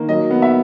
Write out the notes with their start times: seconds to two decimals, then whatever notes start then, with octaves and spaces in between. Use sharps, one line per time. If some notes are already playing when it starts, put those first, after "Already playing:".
Already playing: D#3 A#3
0.09 F#3 D#5
0.31 B3
0.42 E5